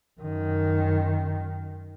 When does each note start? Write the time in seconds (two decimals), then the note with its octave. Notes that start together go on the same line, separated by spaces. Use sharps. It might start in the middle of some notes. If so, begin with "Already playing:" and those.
0.21 F#2 D#3